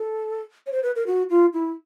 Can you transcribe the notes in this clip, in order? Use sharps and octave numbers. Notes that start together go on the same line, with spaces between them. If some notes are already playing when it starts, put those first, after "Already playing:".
Already playing: A4
C#5
C5
B4
A#4
F#4
F4
E4